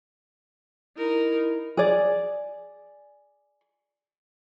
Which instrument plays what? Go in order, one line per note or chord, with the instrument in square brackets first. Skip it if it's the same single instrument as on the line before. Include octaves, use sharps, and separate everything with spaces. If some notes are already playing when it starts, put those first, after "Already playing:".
[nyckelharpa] D#4 A#4 [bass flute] E4
[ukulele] G#4 D5